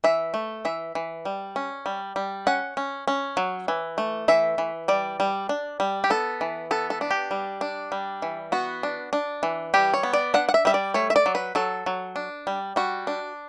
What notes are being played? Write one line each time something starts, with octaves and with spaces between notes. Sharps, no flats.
E3 E5
A3
E3 E5
E3
G3
C#4
G3
G3
C#4 F#5
C#4
C#4
F#3
E3
A3
E3 E5
E3
G3 D5
G3
D4
G3
G4
B3 A4
E3
B3 A4
A4
D4
G4
G3
D4
G3
E3
B3 F#4
D4
D4
E3
G3 G4
C#5
B3
D5
D4 F#5
F#5
E5
G3 E5
D5
A3 C#5
E5
D5
F#3
B4
F#3 A4
F#3
D4
G3
G3 F#4
D4